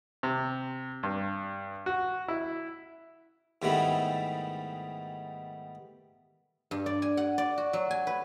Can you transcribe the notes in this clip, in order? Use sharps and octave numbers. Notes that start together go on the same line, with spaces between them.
C3
G2
F#4
E4
G#2 D#3 G3 A3 B3 E4
G2
D5
G#5
F#5
D5
F#4
F#3
G#5
B4